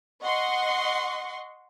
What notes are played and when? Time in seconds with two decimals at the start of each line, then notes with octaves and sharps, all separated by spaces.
0.22 D#5 F#5 C6 C#6